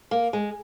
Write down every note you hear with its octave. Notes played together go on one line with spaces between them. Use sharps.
A#3
G#3